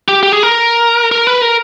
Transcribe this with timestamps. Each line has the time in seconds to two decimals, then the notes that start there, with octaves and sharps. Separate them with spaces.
0.08 G4
0.23 G4
0.32 G#4
0.43 A#4
1.12 A#4
1.27 B4
1.41 A#4